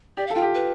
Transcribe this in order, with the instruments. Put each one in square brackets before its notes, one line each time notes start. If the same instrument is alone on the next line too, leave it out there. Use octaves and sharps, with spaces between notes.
[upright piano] G4 [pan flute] D5
[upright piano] A4 [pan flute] F5
[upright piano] F4 [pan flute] G5
[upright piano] G4
[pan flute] B4